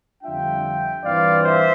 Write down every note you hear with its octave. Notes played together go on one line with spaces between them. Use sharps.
F2 D3 G3 D4 F4 E5 G5
G2 E3 G3 C4 F4 D5 F5
C5 E5